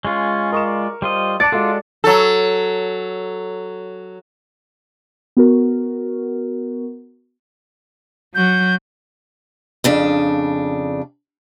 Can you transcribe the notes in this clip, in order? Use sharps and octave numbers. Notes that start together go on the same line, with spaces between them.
G#3 C#4 F4
A#4 D#5 C#6 E7
D5
G3 F4 C5 D#5
D4 D5 A5 C#7
G#3 F4 F#4 A4
F#3 A4
B3 F#4 A#4
F#3 F#4 G6
F2 C#3 D4